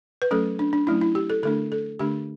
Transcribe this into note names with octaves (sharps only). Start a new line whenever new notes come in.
B4
F#3 A3 C#4 A4
D4
D4
F#3 A3 C#4 E4
E4
G4
A4
D3 A3 D4 A4
A4
D3 A3 D4 G4